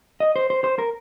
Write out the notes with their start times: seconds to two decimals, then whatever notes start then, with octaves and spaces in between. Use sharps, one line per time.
0.20 D#5
0.36 C5
0.50 C5
0.64 C5
0.78 A#4